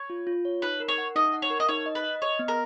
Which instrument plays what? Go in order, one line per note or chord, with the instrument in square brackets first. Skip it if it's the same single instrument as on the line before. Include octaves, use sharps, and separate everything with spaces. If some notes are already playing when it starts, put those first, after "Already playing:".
Already playing: [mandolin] C#5
[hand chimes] F4
F4
C#5
[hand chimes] D#4 [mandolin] B4
[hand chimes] A#4
[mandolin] C#5
[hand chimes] F#5
[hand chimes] D#4 [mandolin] D#5
[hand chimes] F#5
[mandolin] C#5
[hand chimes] A#4
[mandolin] D#5
[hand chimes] D#4 [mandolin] C#5
[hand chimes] D#5
[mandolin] B4
[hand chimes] D#5
[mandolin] C#5 [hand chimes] D#5
[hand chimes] B3
[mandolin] A#4